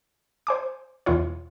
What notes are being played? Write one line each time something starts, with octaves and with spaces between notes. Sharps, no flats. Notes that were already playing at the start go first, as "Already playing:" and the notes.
C5 G#5 D6
E2 B2 E4 F4 C#5